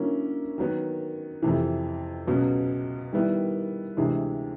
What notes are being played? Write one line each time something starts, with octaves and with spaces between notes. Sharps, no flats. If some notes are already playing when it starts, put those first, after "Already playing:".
Already playing: D3 F#3 A#3 C#4 E4
D#3 F#3 B3
F2 C3 E3
C#2 B2 F#3 B3
D#3 G3 B3 E4
D2 C3 E3 G#3